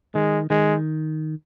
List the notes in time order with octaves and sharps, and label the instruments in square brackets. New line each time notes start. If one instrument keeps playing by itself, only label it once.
[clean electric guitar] D#3 [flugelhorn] G#3
[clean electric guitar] D#3 [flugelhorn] G#3